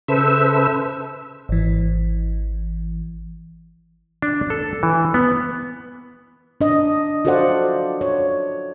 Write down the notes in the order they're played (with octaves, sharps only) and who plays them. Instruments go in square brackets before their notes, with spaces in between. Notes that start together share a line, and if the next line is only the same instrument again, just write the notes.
[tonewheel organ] C#3 A4 B4 C5 E5 E6
[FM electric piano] G#1 E3
[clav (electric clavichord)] D4
A4
E3
B3
[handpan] D4 D#5
F4 F#4 A4 C5 D5 F#5
C#5